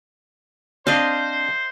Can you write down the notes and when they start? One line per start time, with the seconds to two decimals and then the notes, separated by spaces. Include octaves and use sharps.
0.87 C4 D4 C5 D#5 F5